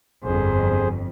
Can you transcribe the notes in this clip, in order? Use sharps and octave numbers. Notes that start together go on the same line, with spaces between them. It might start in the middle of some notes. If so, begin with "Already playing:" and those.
G1 F2 G#4 C5